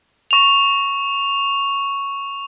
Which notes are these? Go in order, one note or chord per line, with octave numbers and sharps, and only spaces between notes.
C#6 F7